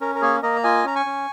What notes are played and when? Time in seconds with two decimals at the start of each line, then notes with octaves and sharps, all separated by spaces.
0.01 C#4 A#4
0.15 A#4
0.22 A#3 G#4 C#5
0.43 A#3 A#4 D#5
0.56 A#5
0.63 F4 D#5 G#5
0.84 C#4 A#5
0.96 G#5 C#6
1.06 C#4